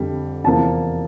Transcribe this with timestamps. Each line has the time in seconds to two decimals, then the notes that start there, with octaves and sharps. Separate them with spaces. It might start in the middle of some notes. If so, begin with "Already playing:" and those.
Already playing: F2 D3 G3
0.44 E2 C3 F3 A#3 A5